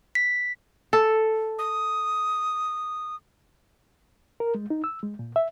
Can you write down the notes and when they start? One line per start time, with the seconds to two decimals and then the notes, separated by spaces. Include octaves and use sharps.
0.15 B6
0.93 A4
1.59 D#6
4.40 A#4
4.55 G#3
4.70 D#4
4.84 E6
5.03 G#3
5.19 A#2
5.36 E5